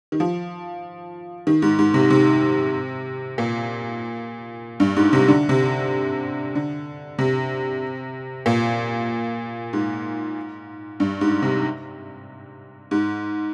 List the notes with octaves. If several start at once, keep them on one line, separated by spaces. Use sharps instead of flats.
D#3
F3
D#3
G#2
G#2
C3
C3
A#2
G2
G#2
C3
D3
C3
D3
C3
A#2
G#2
G2
G#2
C3
G#2